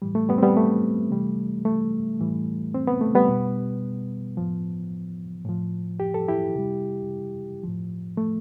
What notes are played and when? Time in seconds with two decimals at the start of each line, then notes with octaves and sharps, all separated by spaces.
0.02 A2 E3 G3
0.15 A3
0.29 G3 B3
0.38 C4
0.43 G3 B3
0.57 A3
1.10 C3 E3 G3
1.65 A3
2.19 A2 E3 G3
2.74 C4
2.87 B3
3.01 A3
3.15 G3 B3
3.28 B2 G3
4.37 A2 F3
5.45 A2 F3
6.00 G4
6.14 A4
6.28 E4 G4
6.55 C3 G3
7.63 A2 F3
8.17 A3